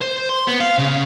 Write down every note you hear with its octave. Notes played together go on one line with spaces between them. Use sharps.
C5
C6
B3
F5
C#3